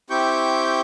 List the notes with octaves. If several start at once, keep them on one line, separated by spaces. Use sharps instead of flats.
C4 E4 G4 G5 C#6 G6